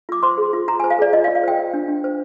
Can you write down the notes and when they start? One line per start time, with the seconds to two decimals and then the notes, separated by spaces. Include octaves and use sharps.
0.09 F4 D6
0.23 C5 C6
0.38 G#4
0.53 F4
0.68 F4 A#5
0.80 C5 G#5
0.90 F5
0.99 G#4 D5
1.13 F4 D#5
1.24 F5
1.28 F4
1.35 F5
1.44 C5 G5
1.59 F4
1.74 D4
1.88 D4
2.04 C5